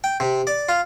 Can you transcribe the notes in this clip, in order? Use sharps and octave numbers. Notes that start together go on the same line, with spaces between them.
G5
C3
D5
F4